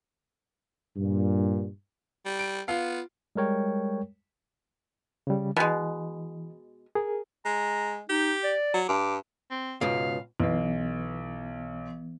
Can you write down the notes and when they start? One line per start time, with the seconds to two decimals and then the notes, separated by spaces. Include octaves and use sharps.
0.97 G2 A#2
2.25 G3
2.39 D7
2.68 B3 F4 F5
3.35 G3 G#3 A#4 C#5 G5
5.27 C#3 G3
5.57 B2 E3 G#3
6.95 G#4 A#4
7.45 G#3 A#5
8.09 D#4 G4
8.44 D5
8.74 F#3
8.89 G2 D6
9.51 C4
9.81 C#2 G#2 B2 F5
10.40 B1 E3 B3